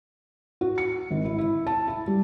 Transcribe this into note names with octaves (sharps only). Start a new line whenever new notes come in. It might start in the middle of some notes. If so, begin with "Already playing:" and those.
F#4
C#7
G#1
E4
E4
A5
E4
G3